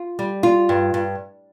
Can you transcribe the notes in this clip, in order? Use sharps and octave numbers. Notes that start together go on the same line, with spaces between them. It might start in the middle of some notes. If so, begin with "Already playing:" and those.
Already playing: F4
G3
F4
G2
G2